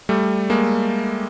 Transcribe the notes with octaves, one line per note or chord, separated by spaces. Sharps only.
G3 A3
G#3 A#3